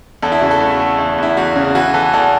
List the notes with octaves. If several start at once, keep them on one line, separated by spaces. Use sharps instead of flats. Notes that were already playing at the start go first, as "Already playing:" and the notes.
E2 A4
E4
C#3 F#4
A4
A3
A3
E2
E2 E4
E2 F#4
C#3
E3 F#4
E3 A4
E2 A4